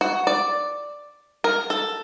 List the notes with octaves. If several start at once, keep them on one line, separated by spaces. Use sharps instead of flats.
F#4
D5
A#4
A4